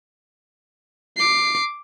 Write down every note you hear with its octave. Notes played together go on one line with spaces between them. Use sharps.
D6 C7